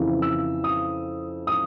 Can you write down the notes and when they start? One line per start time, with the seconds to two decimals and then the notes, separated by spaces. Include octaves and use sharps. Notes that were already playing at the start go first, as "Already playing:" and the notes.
Already playing: F2 C#3 E3
0.22 E6
0.64 D#6
1.47 D#6